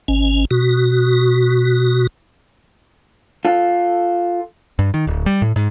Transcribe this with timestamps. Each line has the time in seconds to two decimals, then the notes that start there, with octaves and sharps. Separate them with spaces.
0.08 G#1 C#4
0.51 B2 F#4
3.45 F4 A4
4.79 G2
4.94 D#3
5.07 D1
5.26 G3
5.42 A2
5.56 G#2